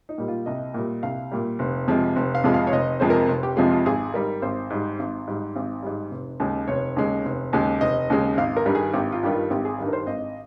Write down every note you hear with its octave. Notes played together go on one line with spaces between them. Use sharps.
D#4
A#2 G3
F4
C2 D#5
A#2 G3
C2 F5
A#2 G3
F1
F2 C3 F3 G#3
F1
F5
F2 C3 F3 G#3
F5
C#5
F1 D#5
F2 C3 F3 G#3 C5
A#4
F1
G4
F2 C3 F3 G#3 F4
F4
G#1 G#4
G#2 G3 A#4
G#1 C5
G#2 G3
G#1
G#2 G3
G#1
G#2 G3
F1
D#2 C#3 G#3
F1 C#5
D#2 C#3 G#3
F1
D#2 C#3 G#3
F1 D#5
D#2 C#3 G#3
G#1 F5
A#4
G2 D#3 G3
G#4
G#1 G4
F4
G2 D#3 G3 G4
F4
G#1 G4
G#4
G2 D#3 G3
A#4
C5
G#1 D#5